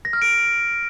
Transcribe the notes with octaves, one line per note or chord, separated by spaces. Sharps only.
A#6
F6
D7